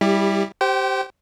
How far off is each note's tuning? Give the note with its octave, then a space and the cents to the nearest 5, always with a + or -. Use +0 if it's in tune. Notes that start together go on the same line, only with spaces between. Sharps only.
G3 +0 E4 -10 G4 +30
G4 -10 C5 +0 G5 -40